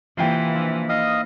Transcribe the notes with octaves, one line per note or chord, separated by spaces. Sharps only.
C3 E3 A#3 F4 B4 C5 G5
F3 D4 E5
D#4 E4 D#5 F5 D#6